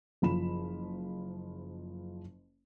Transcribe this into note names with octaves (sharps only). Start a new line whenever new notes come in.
F#1 F3 B5 E7